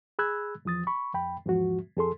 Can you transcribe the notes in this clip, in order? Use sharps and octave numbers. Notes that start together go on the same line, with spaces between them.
G#4 B5 E6 F#6 G#6
E2 F3 D#6 A6
B5 C#6
F2 G5 B5
E2 G#2 F3 F#4
F2 G#4 A4 C6